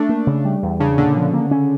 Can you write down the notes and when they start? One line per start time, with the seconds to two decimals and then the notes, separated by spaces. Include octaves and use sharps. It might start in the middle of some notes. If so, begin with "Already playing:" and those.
Already playing: A3 D4
0.09 A#3
0.27 C#3
0.45 G3
0.63 E2
0.80 C#3 D4
0.97 A#2 D3
1.16 F3
1.33 A#3
1.51 C#4